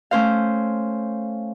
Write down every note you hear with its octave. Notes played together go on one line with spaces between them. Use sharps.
A3 C#4 C5 F5